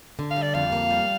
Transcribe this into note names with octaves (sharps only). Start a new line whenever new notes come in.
D3
F5
G3
D5
F2 F5
A#3
G3